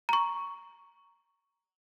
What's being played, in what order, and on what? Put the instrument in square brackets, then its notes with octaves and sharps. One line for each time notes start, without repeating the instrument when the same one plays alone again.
[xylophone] A#5 C#6